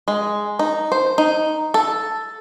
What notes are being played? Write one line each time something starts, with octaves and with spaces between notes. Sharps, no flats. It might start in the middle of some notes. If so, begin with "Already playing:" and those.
G#3
D#4
C5
D#4
A4